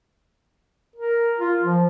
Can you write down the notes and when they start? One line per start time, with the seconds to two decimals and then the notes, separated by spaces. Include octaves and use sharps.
0.96 A#4
1.39 F4
1.63 F3